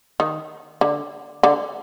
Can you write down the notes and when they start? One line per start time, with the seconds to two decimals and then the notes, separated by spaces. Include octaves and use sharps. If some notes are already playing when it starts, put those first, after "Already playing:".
0.20 D#3
0.81 D3
1.43 D3